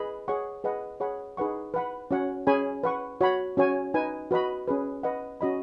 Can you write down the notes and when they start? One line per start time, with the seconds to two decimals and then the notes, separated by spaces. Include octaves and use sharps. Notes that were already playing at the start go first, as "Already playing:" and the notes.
Already playing: G#4 B4 D#5 B5
0.28 G#4 C#5 F#5 C#6
0.64 G#4 B4 D#5 F#5
1.00 G#4 C#5 F#5 B5
1.37 D#4 G#4 B4 F#5 C#6
1.74 B4 F#5 B5
2.11 C#4 F#4 C#5 F#5
2.47 C#4 G#4 C#5 G#5 B5
2.83 B4 F#5 C#6
3.21 F#4 C#5 F#5 B5
3.57 C#4 F#4 C#5 G#5
3.94 D#4 B4 G#5
4.31 F#4 B4 D#5 B5
4.68 C#4 G#4 B4
5.03 B4 D#5 F#5
5.41 C#4 F#4 D#5 B5